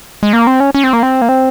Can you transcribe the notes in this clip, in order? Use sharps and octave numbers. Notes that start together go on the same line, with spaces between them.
G#3
A#3
C4
C#4
C#4
C4
A#3
C4
A#3
C4